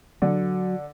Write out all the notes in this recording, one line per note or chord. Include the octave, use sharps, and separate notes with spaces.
D3 F#3